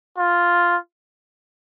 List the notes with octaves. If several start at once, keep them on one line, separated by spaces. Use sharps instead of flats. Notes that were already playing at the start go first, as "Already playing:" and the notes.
F4